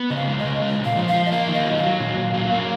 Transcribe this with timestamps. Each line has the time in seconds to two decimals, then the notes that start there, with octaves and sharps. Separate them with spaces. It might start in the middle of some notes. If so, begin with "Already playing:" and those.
Already playing: B3
0.10 C#3 D#5
0.16 F5
0.27 G#3
0.39 D#5
0.44 C#3
0.62 G#3
0.79 A#2
0.85 F5
0.96 F3
1.08 F5
1.13 F3
1.25 D#5
1.31 A#3 F5
1.48 D#3
1.54 D#5
1.66 F#3
1.77 F5
1.83 F#3
2.00 A#2
2.17 A#2
2.34 F#3
2.51 A#3